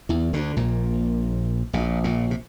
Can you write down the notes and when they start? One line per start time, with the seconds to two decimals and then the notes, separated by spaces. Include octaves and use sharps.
0.09 E2 E3
0.33 D2 D3
0.57 A#1 A#2
1.73 A#1 A#2
2.04 A#1 A#2
2.31 C3